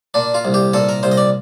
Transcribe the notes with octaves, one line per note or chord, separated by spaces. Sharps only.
A#2 D4
F4
C2
G4
A#2 A4
A#4
C2 C5
D#5
D5